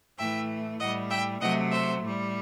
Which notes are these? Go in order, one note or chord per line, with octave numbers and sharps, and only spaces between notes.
A2 E3 A3 E5 G5
A2 G3 D#5 F#5
E5 G5
C3 F#3 A3 D#5 F#5
C5 E5
A2 G3